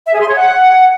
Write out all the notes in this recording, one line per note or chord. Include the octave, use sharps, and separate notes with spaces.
E5
G#4
C6
C#5
F#5